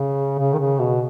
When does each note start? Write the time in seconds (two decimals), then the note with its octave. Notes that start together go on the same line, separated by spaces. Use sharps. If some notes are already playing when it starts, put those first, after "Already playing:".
Already playing: C#3
0.39 C#3
0.53 D#3
0.58 C#3
0.79 B2